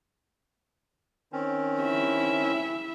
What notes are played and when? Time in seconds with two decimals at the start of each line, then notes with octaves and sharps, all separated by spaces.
1.32 D#3 C4 C#4
1.81 E4 E5